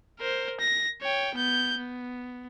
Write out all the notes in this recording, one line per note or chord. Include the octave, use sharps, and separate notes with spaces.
A#4 C5
A#6
C#5 G5
B3 G6
B3